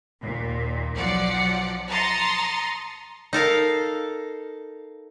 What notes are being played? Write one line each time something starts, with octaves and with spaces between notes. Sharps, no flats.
D#2 A#2
B1 F3 F#3 D5 F#5
A5 A#5 C6 D#6 A6 C#7
D#4 A4 A#4 F5